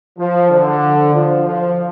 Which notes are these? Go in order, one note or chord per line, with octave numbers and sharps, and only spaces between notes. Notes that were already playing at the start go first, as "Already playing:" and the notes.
F3
D3
F3
F3